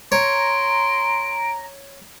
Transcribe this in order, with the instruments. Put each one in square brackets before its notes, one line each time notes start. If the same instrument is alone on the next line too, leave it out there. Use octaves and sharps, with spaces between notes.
[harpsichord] C#5 [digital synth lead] A#5 [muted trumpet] C6 [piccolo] D7